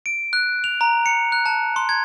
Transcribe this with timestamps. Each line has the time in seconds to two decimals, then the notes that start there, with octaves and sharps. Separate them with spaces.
0.06 D7
0.33 F#6
0.64 F7
0.81 A#5
1.06 C#7
1.32 F#6
1.46 A5
1.76 C6
1.89 G#6